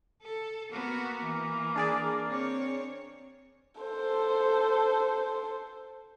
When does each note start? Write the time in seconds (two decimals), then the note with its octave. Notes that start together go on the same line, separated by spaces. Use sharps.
0.22 A4
0.72 A#3 B3 F#4
1.24 E3
1.76 D4 G#4 D5
2.28 C4 C#5
3.81 A4 C5